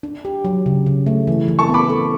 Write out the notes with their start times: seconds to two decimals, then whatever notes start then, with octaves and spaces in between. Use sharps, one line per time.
0.03 D4
0.25 G4
0.45 F#3
0.66 C#3
0.86 C#3
1.07 A3
1.27 E3
1.48 E3
1.59 A5 C#6
1.69 B3
1.74 B5 D6
1.89 A4